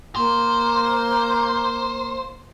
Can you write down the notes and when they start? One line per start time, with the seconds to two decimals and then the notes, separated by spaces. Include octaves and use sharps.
0.16 A#3 C5